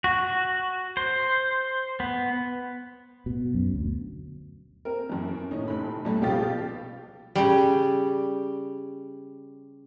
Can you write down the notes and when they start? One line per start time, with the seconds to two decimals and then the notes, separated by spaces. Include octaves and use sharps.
0.04 F#4
0.97 C5
2.00 B3
3.26 B2
3.54 F#2
3.74 D2
4.85 C4 A#4
5.09 F#2 E3
5.51 A2 D#3 C#4 D#4
5.68 F1 B5
6.05 B1 G3 A3
6.21 C#2 B2 F3 G4 F5 A6
7.35 C#3 G3